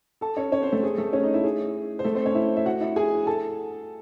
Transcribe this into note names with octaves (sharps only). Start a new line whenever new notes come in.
A4 A5
C#4 C#5
C#4 C#5
C4 C5
A3 A4
G#4
A3 A4
C#4 C#5
D#4 D#5
E4 E5
G#4
C5
A3 A4
C4 C5
C#4 C#5
E4 E5
E5
F#4 F#5
E4 E5
G#4 G#5
A4 A5